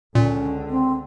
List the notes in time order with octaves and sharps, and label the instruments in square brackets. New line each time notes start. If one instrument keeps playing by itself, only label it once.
[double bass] C#2 D3 [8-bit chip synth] A#2 [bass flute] C#4
[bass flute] C4